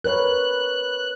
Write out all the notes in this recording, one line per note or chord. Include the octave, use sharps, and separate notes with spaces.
A#4 B4 C#5 F#6